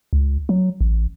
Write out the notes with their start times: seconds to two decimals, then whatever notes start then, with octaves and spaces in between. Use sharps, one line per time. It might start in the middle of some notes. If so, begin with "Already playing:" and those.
0.13 C#2
0.49 F#3
0.81 A1